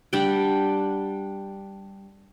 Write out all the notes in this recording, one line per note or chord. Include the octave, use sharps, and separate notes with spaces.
G3 D4 F#5 G5